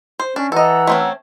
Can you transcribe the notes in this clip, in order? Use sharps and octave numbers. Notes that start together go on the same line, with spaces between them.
C5
C#4 D4
E3 A4 D#5 F#5 A#5 E6
A3 C4 C#4